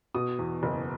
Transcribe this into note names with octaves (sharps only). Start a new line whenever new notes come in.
B2 D#6
E2
F#1